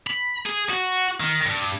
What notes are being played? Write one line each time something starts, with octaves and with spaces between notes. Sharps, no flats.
B5
G#4
F#4
D#3
G2